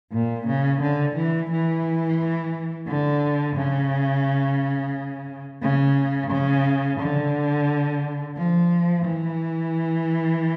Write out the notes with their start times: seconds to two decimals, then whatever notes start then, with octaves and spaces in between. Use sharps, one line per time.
0.13 A#2
0.47 C#3
0.81 D3
1.15 E3
1.50 E3
2.87 D3
3.56 C#3
5.62 C#3
6.31 C#3
6.99 D3
8.36 F3
9.05 E3